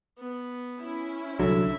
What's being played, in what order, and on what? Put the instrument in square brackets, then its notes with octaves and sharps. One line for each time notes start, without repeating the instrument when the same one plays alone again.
[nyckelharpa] B3
[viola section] C#4 E4
[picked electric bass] C2 F#3 [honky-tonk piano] D3 [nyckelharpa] E5